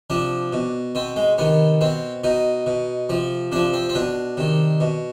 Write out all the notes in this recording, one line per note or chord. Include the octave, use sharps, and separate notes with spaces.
C3 F3 D4
B2
B2 C4
G#3
C3 D#3 B3
B2 C4
B2 D#4
B2
C3 F3
C3 F3 D4
C4
C4
B2 D4
C3 D#3
B2